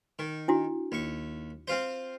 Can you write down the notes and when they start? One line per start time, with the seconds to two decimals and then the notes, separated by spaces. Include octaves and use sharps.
0.19 D#3
0.48 D4 E4 F#4
0.92 D#2 C#6
1.68 C4 F4 C5